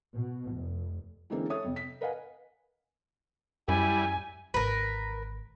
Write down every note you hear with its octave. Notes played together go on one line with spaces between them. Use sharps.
B2
F1
D3 E3 G#3 A#3 C4 C#4
A4 C#5 E5 D#6
F2 C3
B6
A#4 B4 D#5 F5 F#5 G#5
F#2 G3 E4 G#5
G#1 D3 A#4 B4